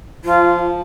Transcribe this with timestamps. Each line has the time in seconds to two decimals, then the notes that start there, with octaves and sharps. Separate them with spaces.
0.25 F3 F4